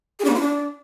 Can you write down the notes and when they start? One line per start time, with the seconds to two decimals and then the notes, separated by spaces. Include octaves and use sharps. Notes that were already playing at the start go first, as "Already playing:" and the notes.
0.19 G#4
0.24 D4
0.30 B3
0.35 F4
0.40 D4